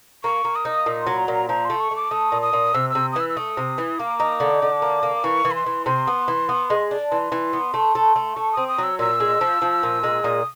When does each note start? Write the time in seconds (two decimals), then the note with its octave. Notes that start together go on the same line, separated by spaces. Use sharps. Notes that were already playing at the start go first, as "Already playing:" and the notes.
0.24 A#3 C#6
0.45 A#3
0.56 D#6
0.65 D#4
0.86 A#2
1.02 F#3 C6
1.18 A#5
1.28 A#2
1.34 A#5
1.49 F3 A#5
1.65 A3 C6
1.80 C#6
1.91 A3
1.96 D6
2.11 A3 D#6
2.32 A#2
2.42 D#6
2.53 A#2
2.74 C3 E6
2.90 E6
2.95 C3
3.12 D#6
3.16 E3 E6
3.29 E6
3.36 A3 D#6
3.57 C3
3.78 E3
3.99 A#3 D6
4.20 D#4
4.40 D3
4.62 D3
4.82 A#3
5.03 A#3
5.24 E3 C#6
5.45 E3
5.51 B5
5.55 C6
5.66 E3
5.86 C3 C6
6.07 B3
6.28 E3
6.49 B3
6.70 G#3
6.91 D4
7.11 E3 C6
7.32 E3
7.53 B3
7.74 A3
7.95 A3
8.16 A3
8.36 A3 C#6
8.53 C4 D#6
8.68 D#6
8.78 F#3
8.83 E6
8.99 A#2 E6
9.20 G#3
9.41 F3
9.62 F3
9.83 A#2
10.03 G#3
10.24 A#2 D#6